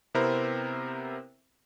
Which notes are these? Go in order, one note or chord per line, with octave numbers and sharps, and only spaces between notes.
C3 B3 C4 E4 A#4 C5